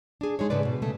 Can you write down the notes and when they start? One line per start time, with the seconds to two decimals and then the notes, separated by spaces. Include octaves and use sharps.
0.21 D4 G#4
0.39 G#3 D#4 C#5
0.50 G#2 C#3 A3 B4 D5
0.65 B2
0.82 C#3 A3